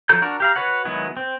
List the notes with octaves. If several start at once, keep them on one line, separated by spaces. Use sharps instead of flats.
F3 F#3 A4 A#5 G6
D4 F#4 A#4
G4 F5 A#5
F#4 B4 C#5 F#5
D#3 F#3 G#3 B3 E4
C4